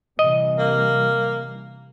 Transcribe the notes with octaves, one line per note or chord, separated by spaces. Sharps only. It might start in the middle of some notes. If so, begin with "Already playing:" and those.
C3 E3 G3 D#5
A#3